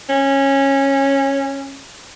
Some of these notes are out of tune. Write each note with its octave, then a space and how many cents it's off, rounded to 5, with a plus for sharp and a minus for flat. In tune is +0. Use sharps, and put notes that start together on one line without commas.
C#4 -15